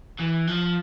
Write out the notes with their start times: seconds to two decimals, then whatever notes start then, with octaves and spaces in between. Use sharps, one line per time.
0.19 E3
0.47 F3